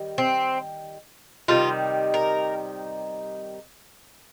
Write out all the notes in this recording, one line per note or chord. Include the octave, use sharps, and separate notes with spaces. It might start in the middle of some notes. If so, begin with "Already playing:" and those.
Already playing: D#3 G3
C4
C3 D#3 G3 F4
A#4